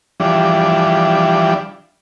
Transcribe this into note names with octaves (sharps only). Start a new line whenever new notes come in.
E3 F3 G3 D4